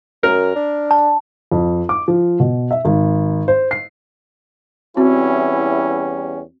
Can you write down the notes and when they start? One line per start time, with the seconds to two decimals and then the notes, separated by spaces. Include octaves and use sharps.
0.23 F#2 A#4
0.55 D4
0.91 A5
1.52 F2
1.89 D6
2.08 F3
2.40 B2
2.71 E5
2.85 G#1
3.48 C5
3.71 C7
4.97 E2 G3 C4 C#4 E4 F#4